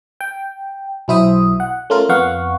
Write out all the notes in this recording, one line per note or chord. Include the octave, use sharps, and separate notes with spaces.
G5
B1 F#3 E4 C5 E5 D#6
F#5
A3 C#4 F4 A#4
F2 B3 F5 F#5 C#6